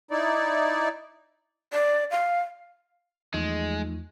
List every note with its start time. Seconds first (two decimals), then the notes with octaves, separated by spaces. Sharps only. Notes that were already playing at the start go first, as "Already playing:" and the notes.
0.11 D#4 E4 D5
1.73 D5
2.11 F5
3.34 E2 F3 G#3 A3 D#4